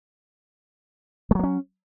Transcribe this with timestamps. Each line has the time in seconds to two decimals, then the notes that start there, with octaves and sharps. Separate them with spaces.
1.31 G#3
1.35 F#3
1.39 A#3
1.43 C#4